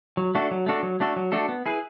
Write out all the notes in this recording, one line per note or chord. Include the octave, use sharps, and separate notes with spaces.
F#3
A3 D4 F#4 A4
F#3
A3 D4 F#4 A4
F#3
A3 D4 F#4 A4
F#3
A3 D4 F#4 A4
B3
E4 G#4 B4